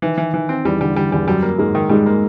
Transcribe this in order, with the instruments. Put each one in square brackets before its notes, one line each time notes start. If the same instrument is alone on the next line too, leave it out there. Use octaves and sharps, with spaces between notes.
[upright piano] D#3 [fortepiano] E3
[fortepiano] E3
[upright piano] D#3 [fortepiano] E3
[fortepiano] C4
[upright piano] E2 E3 [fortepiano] G3
[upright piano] D3 [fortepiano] G3
[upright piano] D3 [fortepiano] G3
[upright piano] E2 E3 [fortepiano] G3
[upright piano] F#2 F#3 [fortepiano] G3
[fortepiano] A#3
[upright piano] G#2 G#3 [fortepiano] A#3
[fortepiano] D#3
[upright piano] G#2 G#3 [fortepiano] G3
[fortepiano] A#3